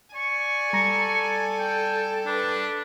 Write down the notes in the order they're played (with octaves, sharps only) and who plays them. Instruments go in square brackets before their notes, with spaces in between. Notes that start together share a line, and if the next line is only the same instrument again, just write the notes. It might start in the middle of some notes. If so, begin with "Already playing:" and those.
[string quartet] D5 G#5 [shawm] C#6
[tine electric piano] G3 A#5 A#6 [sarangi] A4
[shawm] G5
[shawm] D4 [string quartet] B4